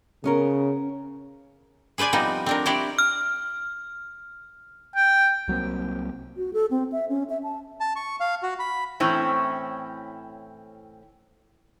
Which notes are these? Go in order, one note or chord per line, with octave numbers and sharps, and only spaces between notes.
C#3 B3 C#4 A#4
G#4 B4 C5 D5 G#5
F3 G3 B3 C4 D#4
C4 D4 A#4
E4 F#4 G4 C5 D5
F6
G5
C2 F#3 A#3 C4
F#4
A4
C4
E5
C#4
E5
A5
A5
C#6
F5
F#4
B5
A2 E3 C4 C#4 E4